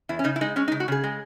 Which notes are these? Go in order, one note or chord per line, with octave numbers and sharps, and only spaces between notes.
E2 E4
C#4
C#3 D#4
E4
G#3 D#4
G#3 C#4
D#4
C#3
F#4
C#3 G#4
G#3